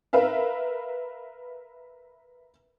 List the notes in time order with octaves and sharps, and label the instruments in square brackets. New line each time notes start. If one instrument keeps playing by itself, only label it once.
[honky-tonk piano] A#4 B4 E5 F5